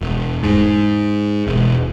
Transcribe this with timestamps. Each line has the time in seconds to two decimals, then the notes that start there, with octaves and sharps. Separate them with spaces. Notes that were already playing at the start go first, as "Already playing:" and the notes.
0.01 E1
0.43 G#2
1.47 E1